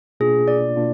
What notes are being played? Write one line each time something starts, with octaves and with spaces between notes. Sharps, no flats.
B2 A#3 D4 F4 G#4
D5
B2 A#3 D4 F4